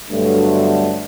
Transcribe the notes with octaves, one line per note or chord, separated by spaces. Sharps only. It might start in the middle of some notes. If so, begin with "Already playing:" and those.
G2 B2 D3 F#3 A3